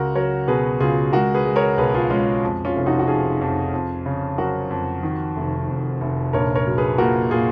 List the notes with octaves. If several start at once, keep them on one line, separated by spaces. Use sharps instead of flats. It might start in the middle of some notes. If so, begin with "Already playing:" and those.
Already playing: C#2 F#4 A#4
F#3 A#4 C#5
B2 G#4 B4
C#2 F4 G#4
G#3 F#4 A#4
G#4 B4
G#3
A#4 C#5
B1 G#4 B4
F4 G#4
G#3 C#4 F4
F2
C#4 F4
F1
D#4 F#4
F#4
F2 F4 G#4
F2
F2
C#3
F#3 F#4 A#4
F2
D#3
F1
F1
F1
A#1 A#4 C#5
A#4 C#5
F#3
G#4 B4
A#2 F#4 A#4
A#2 F4 G#4